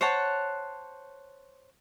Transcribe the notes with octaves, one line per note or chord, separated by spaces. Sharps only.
C5 C#5 F#5 A5